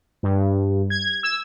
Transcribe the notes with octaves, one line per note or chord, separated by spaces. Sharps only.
G2
G#6
E6